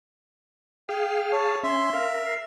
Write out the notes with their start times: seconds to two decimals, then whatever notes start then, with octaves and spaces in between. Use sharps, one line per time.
0.89 G#4 F5 G5
1.32 C#5 A5
1.63 C#4 E5 C6
1.93 A#4 F5
2.25 C7